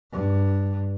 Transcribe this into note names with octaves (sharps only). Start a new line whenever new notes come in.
G2